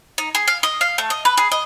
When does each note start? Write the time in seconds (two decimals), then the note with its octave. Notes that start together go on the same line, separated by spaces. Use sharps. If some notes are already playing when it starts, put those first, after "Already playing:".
0.18 D#4
0.35 G#4
0.48 F5
0.63 D#5
0.81 F5
0.98 A3
1.10 D#5
1.25 B4
1.37 G#4
1.52 D#5